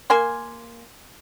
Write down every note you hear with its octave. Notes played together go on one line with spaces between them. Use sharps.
A#3 G#5 C6